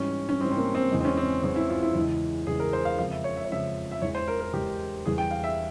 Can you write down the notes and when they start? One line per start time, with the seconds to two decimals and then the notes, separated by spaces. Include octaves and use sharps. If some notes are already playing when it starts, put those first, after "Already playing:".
Already playing: G#2 E3 G3 C#4
0.29 C#4
0.40 G#2 E3 G3 C4
0.51 C4
0.57 A#3
0.75 C4
0.91 E2 E3 G#3
1.01 C4
1.05 C#4
1.17 C4
1.43 E2 E3 G#3 C4
1.56 E4
1.69 F4
1.82 E4
1.95 E2 C#3 E3 G#3
2.47 E2 C#3 E3 G#3 G#4
2.60 A#4
2.73 C5
2.85 F5
2.98 F2 C#3 F3 G#3 F5
3.11 E5
3.24 C#5
3.37 E5
3.45 C#5
3.50 F2 C#3 F3 G#3 E5
3.92 E5
4.02 E2 E3 G#3 C#5
4.15 C5
4.28 A#4
4.40 A#4
4.53 E2 E3 G#3 G4
5.05 E2 E3 G3 G#4
5.18 G5
5.31 F5
5.44 E5